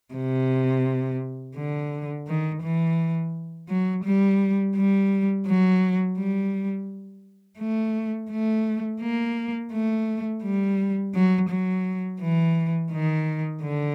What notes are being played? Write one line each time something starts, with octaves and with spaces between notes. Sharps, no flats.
C3
D3
D#3
E3
F#3
G3
G3
F#3
G3
A3
A3
A#3
A3
G3
F#3
F#3
E3
D#3
D3